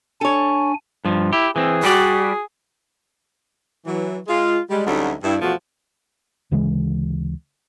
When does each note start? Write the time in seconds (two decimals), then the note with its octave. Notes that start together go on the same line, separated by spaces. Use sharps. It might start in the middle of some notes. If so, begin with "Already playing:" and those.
0.21 D4 A4 C#5 G#5
1.05 G2 F3
1.33 E4 G4
1.56 E3 C4 G#4
1.83 G3 F#4 G4 D5
3.86 E3 F#3
4.27 G#3 F4
4.69 G3 G#3
4.86 D2 F#3 G3 A3 C#4 D#4
5.22 G2 E4
5.40 E2 B2 F3 A3 F4 F#4
6.51 D2 C#3 E3 G#3